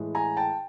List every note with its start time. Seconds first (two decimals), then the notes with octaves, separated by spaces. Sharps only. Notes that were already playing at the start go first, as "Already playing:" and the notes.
Already playing: A2 E3 G#3
0.15 G#5 A#5
0.37 G5 A5